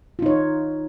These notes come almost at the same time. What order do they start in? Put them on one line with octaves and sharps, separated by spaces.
F4 D#4 C#5